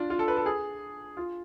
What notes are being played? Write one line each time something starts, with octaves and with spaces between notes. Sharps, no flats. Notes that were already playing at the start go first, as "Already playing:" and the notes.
Already playing: D4 F4
F4
A4
B4
A4
G#4
F4